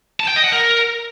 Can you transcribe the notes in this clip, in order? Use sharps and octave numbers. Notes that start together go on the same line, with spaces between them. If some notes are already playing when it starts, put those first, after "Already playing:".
A5
G5
D#5
F#5
A#4